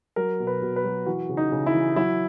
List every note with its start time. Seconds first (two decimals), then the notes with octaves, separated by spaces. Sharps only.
0.16 F#3 A#4
0.40 B2
0.47 B4
0.62 B2
0.76 B4
0.84 F#3
1.06 E3 F#4
1.29 C#3
1.37 D#4
1.52 C#3
1.66 E4
1.74 E3
1.96 F#3 E4